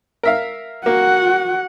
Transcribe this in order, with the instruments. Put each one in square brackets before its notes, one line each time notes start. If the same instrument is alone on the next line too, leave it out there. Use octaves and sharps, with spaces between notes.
[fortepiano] A#4 E5 F5
[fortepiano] A#3 [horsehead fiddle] F#4 F#5